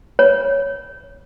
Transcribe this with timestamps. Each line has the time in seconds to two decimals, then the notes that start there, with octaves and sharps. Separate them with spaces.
0.19 C#5